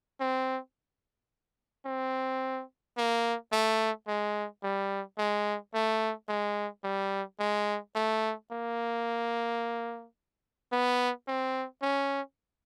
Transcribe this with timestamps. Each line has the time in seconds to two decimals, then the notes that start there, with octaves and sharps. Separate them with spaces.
0.20 C4
1.85 C4
2.97 A#3
3.52 A3
4.08 G#3
4.63 G3
5.18 G#3
5.74 A3
6.29 G#3
6.84 G3
7.40 G#3
7.95 A3
8.51 A#3
10.72 B3
11.27 C4
11.82 C#4